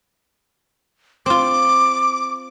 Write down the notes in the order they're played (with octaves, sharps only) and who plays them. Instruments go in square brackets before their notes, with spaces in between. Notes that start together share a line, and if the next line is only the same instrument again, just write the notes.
[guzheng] C4 F4 [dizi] D6